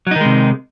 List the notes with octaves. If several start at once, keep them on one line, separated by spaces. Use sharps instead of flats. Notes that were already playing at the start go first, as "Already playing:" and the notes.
C3 D#3 F#3 G#3 D#4